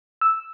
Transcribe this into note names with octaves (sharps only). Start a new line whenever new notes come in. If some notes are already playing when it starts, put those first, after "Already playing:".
E6